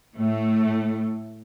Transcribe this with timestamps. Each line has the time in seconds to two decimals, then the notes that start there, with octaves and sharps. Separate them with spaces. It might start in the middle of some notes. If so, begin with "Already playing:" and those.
0.16 A2 A3